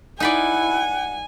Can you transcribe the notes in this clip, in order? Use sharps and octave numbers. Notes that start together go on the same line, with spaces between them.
D#4 E4 B4 D5 F#5 G#5